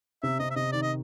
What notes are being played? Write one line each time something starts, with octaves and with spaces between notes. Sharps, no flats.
C3 E5
C3 D#5
E5
C3 D#5
D#3 D5
D#5